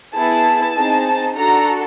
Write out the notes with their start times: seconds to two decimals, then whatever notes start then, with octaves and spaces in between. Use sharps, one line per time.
0.15 B3 E4 G#4 A5
0.75 C4 D#4 G#4
1.36 D4 F#4 A4 A#5